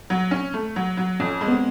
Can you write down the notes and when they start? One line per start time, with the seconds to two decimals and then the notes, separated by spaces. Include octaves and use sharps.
0.10 F#3
0.31 C#4
0.54 A3
0.76 F#3
0.97 F#3
1.20 F2 C#4
1.41 G#3
1.48 B3
1.52 C4